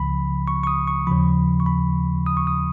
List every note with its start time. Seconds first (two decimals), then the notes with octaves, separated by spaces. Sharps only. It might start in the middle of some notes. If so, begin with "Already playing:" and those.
Already playing: C#2 C#3 F3 B5
0.48 C#6
0.63 C#6
0.67 D#6
0.87 C#6
1.07 D#2 C#3 F3 B5
1.60 C#6
1.66 B5
2.26 D#6
2.37 C#6
2.47 D#6